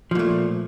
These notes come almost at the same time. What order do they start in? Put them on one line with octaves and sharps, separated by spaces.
F3 A#2 A3